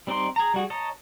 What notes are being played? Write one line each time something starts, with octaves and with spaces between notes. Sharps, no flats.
G3 C4 D#4 D5 C6
G#4 A#5
G3 F#4 G#4
C#5 D#5 A5 A#5